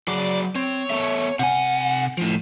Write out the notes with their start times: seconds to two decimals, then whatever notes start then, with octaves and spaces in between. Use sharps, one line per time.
0.08 F#3 F#4 G#4 D5
0.55 C4 C#5
0.90 B3 A4 E5
1.39 C3 F#5 G#5
2.17 A2 F3